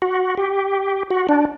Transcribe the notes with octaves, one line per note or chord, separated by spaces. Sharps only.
F#4
G4
F#4
D4